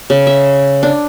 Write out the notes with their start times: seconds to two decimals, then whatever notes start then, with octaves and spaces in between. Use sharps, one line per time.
0.10 C#3
0.27 E5
0.83 D4